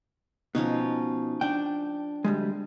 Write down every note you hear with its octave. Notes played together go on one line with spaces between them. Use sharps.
B2 F3 C#4 D#4
D4 G5
D2 G3 G#3